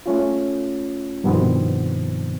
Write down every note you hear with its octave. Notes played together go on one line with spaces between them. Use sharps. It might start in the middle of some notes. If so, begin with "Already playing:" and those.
A3 C#4 F4
G2 B2 D#3 F3 B3 C4